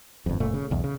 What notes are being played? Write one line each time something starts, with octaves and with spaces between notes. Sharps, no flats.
G1 F2
F#1 A#2 A3
C#3
B1 E2
C#3